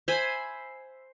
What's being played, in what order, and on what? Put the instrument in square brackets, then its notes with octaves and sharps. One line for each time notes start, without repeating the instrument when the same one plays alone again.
[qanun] C5 E5 G#5 B5